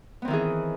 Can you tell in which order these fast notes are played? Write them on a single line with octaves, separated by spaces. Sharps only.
B3 C4 D#3 E3 G#4